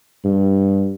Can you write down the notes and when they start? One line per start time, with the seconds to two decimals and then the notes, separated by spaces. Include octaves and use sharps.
0.25 G2